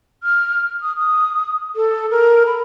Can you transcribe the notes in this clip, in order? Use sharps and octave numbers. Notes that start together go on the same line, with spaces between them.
F6
D#6
D#6
A4
A#4
B5